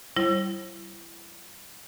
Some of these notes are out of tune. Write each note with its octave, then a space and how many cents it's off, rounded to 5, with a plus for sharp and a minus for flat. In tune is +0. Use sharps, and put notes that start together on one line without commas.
G3 -25 E4 +30 C5 +45